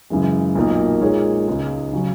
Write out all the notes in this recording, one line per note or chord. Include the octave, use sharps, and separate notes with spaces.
F#2 C#3 E3 G#3
B1 A#2 A#3 D#4 A#4
A#2 G#3 D#4 G#4 C#5
C#2 C#3 G#3 D#4
C#3 F#3 C#4